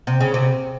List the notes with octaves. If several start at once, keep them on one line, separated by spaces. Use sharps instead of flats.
C3
C#3
C3